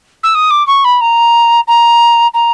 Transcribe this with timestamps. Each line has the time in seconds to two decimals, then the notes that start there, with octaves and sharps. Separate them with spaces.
0.23 E6
0.35 D#6
0.51 D6
0.67 C#6
0.85 B5
1.01 A#5
1.68 A#5
2.34 A#5